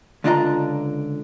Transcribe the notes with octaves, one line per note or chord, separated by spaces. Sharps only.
C#2 D3 D4 F4 D#5 A#5